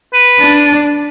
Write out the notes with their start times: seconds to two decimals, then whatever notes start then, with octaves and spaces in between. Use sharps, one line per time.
0.13 B4
0.40 D4